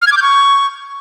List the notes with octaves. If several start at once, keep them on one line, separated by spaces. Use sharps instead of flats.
F6
G#6
D6
G6
C#6